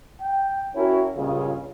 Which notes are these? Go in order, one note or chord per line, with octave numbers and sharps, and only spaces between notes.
G5
C#4 E4 F#4 A#4 C#5 G5
C#2 G2 A#2 C#3